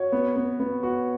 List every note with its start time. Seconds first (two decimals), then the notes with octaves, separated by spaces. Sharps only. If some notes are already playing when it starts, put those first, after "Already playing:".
Already playing: F#4 C#5
0.12 B3
0.36 B3
0.60 B3
0.83 F#4